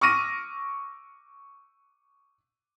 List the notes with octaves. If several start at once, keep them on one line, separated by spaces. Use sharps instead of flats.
C#6 D6 E6 F6 A#6 D#7